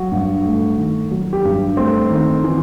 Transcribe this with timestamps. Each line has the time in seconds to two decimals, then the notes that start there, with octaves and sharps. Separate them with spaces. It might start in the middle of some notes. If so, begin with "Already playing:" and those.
Already playing: F#3 F#4
0.12 G2
0.45 A3
0.77 D#3
1.11 F#3
1.33 G4
1.45 G2
1.77 A3 C4
2.10 D#3
2.44 E3